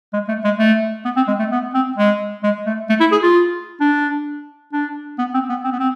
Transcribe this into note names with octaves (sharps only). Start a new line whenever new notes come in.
G#3
A3
G#3
A3
B3
C4
G#3
A3
B3
C4
G#3
G#3
A3
A3
E4
G#4
F4
D4
D4
B3
C4
B3
C4
B3
C4